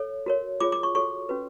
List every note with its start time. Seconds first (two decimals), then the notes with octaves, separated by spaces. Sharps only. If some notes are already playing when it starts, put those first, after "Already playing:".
Already playing: A4 C#5
0.26 F#4 A#4 C#5
0.60 F4 G#4 C#5 D6
0.72 D6
0.83 C#6
0.95 F#4 A4 C#5 C#6
1.29 C#4 F#4 B4